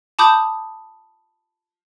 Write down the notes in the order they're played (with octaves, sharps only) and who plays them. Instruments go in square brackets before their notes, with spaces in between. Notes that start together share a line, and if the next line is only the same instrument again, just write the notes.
[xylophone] A5 B5 D6 D#6 G6